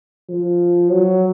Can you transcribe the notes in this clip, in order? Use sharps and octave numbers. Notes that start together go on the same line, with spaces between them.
F3
F#3